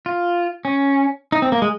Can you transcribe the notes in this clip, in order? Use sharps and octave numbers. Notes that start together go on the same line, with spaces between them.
F4
C#4
D#4
C4
A#3
G#3